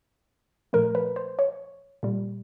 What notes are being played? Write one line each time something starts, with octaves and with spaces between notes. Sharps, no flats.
A#2 F3 A3 A#4
B4
C5
C#5
A#2 G3